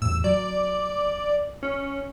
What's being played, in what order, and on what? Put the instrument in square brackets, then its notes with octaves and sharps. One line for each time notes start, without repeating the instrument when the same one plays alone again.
[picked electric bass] E2 A2 [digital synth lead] E6
[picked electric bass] F#3 [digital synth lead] D5
[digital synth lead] C#4